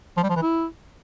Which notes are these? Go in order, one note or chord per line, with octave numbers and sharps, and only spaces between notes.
F3
G3
F3
E3
E4